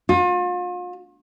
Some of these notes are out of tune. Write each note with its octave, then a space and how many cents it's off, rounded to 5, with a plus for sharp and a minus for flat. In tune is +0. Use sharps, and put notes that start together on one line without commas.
F4 +40